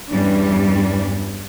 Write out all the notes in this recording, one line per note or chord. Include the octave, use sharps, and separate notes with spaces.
E2 G2 E3 G3 C#4 D4